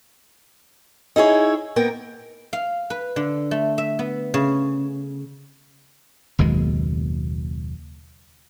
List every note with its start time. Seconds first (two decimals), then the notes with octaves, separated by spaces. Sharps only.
1.16 D#4 E4 G#4 C#5
1.76 A#3 B3 A#4 G5
2.53 F5
2.90 B4
3.16 D3
3.51 A3
3.78 E5
3.99 B3
4.34 C#3
6.39 F#1 D#2 B2 G#3